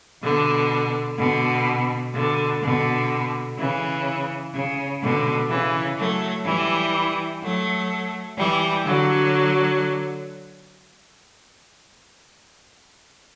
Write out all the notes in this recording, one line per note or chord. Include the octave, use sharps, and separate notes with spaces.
B2 D3
B2 D3
B2 D3
B2 D3
C#3 E3
C#3
B2 D3
C#3 E3
F#3 A3
E3 G3
F#3 A3
E3 G3
D3 F#3